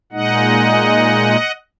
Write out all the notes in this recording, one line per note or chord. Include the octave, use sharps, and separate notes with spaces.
A#2 G#3 D#4 D#5 F#5